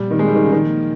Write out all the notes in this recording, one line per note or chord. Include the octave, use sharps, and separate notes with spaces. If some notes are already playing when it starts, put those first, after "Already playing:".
Already playing: A#2 F3 G3 C4
D#3
G#3
G3
D#3
C#3
A#2 D#3 F3 A#3